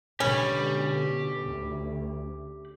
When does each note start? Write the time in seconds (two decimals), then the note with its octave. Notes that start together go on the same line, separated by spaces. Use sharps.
0.20 B2 D3 C#4 G4 B5
1.47 D2